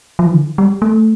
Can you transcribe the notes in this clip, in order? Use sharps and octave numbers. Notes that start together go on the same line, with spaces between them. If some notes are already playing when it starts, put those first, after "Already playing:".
F3
E3
D3
G3
A3